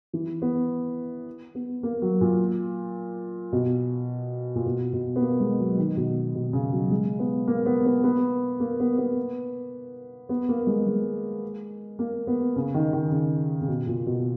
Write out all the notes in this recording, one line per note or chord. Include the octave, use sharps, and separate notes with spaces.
E3
B3
B3
A#3
F#3
A#2
B2
A#2
B2
B2
B3
A#3
G#3
F#3
D#3
B2
B2
C#3
F#3
G#3
B3
A#3
B3
B3
B3
A#3
B3
B3
B3
A#3
G#3
G#3
A#3
B3
C#3
D#3
D#3
C#3
C#3
B2
A#2
B2